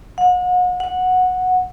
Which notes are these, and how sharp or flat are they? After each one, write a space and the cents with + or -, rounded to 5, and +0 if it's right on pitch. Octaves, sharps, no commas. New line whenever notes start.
F#5 -40
F#5 -10